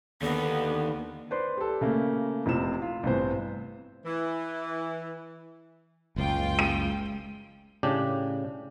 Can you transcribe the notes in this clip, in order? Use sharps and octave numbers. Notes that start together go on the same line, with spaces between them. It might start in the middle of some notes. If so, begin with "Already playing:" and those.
D#2 D3 B3
B4 C5 D5 C6
G4 A4
C#3 A3 A#3
F1 C3 F3 E7
F4
A1 G2 C3 B3 C5
E3
F#1 C#2 F4 G5
G#3 D#7
A2 C#3 D4 G4